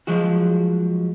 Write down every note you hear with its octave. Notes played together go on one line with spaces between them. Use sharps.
F3 F#3 G#3 F#4